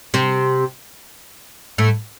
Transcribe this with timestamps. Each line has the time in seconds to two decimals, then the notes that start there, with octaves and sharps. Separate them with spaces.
0.14 C3 C4
1.78 A2 A3